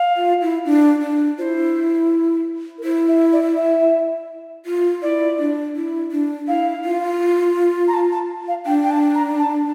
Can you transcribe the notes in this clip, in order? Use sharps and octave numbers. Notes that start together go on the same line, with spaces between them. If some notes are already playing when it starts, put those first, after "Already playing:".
Already playing: F5
F4
E4
D4
D4
E4 F4 C5
A#4
E4 C5
E5
D5
E5
F4
E4 D5
D4
E4
D4
E4 F5
F4
A#5
A5
A5
F5
D4 G5
G5
A5
A#5
A5